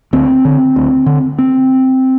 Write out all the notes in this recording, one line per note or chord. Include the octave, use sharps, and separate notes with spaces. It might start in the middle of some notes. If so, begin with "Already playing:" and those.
D2 C4
D3
D2
D3
C4